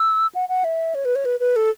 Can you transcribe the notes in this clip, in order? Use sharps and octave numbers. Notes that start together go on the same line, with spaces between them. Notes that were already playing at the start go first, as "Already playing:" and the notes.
Already playing: E6
F#5
F#5
E5
C#5
B4
C#5
B4
B4
A4